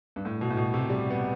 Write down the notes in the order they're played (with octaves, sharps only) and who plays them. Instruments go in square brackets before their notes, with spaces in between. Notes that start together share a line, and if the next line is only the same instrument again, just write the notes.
[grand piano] G2
A2
B2
A2
B2
C3
G3
B3